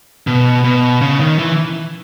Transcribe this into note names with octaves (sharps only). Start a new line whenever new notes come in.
B2
B2
C#3
D#3
E3